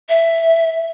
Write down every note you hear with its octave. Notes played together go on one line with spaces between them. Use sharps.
E5